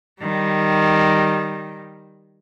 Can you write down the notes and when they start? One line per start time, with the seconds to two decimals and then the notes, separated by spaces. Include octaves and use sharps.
0.21 D#3 G3